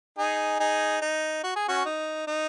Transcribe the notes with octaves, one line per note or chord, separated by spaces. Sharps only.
D#4 G#4
D#4 G#4
D#4
F#4
G#4
C#4 F#4
D#4
D#4